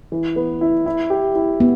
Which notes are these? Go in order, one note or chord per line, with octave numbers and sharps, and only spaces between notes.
E3
B3
E4
E4
G4
E4
B3